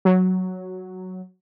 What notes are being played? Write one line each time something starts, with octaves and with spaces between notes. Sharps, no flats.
F#3